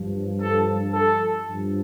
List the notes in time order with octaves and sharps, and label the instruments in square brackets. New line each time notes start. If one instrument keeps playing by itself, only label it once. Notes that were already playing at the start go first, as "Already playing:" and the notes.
Already playing: [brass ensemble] G2 F3
A4
A4
G2 F3